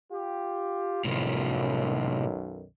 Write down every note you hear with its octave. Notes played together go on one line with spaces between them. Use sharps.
F4 G4
B1 F#2 A2 C3 D#3 F3